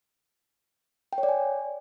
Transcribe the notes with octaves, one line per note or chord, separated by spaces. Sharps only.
G5
C#5
D5
G#5